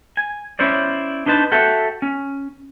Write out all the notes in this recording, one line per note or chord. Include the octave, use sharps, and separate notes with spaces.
G#5
C#4 E4 C5 D5
D4 D#4 B4 C5 A5
F#4 A4 E5 G5
C#4